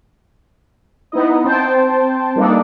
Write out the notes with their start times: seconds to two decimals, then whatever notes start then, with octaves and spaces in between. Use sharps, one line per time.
1.12 B3 D#4 E4 D#5
1.44 C4 C5 G5 A5
2.36 G3 A#3 D4 D#4 A4 D5